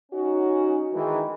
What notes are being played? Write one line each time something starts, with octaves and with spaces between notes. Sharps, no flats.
C#4 D#4 F#4
D#3 E3 G#3